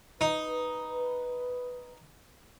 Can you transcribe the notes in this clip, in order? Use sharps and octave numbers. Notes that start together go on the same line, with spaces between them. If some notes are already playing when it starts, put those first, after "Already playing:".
D#4 B4